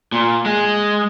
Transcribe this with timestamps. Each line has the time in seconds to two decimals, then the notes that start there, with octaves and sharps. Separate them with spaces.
0.12 A#2
0.46 G#3